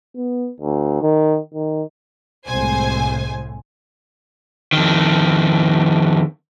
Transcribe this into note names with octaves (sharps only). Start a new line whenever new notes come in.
B3
D2
D#3
D#3
C2 A2 G#3 C5 G#5
F2 D#3